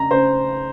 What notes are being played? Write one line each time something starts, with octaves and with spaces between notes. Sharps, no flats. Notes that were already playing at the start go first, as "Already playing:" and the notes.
Already playing: C#3 A#5
C#3 C5